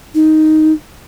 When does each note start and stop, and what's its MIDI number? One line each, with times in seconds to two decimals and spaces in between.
0.15 0.73 63